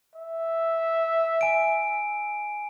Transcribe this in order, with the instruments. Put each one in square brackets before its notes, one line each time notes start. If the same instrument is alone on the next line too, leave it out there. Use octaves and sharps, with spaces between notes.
[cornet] E5
[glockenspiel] G#5 D7